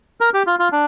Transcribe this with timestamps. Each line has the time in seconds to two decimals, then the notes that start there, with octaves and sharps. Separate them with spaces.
0.21 A#4
0.34 G4
0.47 F4
0.59 F4
0.72 D4